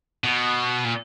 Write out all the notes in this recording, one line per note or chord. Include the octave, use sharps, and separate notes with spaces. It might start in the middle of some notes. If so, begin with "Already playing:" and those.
B2
A#2